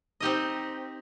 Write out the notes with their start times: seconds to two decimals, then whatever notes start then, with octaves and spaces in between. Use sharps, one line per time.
0.20 C4 D#4 G4 A#4 D#5